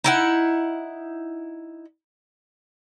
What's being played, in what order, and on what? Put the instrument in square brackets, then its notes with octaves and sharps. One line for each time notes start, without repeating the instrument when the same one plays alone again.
[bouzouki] D#4 E4 F#5